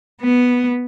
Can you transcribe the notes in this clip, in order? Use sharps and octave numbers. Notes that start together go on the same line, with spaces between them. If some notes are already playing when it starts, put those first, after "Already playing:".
B3